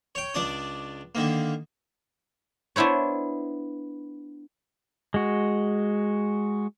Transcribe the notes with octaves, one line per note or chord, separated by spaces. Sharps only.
C#5 G5
C#2 D4 D5 D#6
D3 D#3 A#3
B3 D4 E4 C5 C#5
G#3 F#4